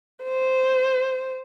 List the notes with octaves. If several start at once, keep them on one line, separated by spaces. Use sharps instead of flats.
C5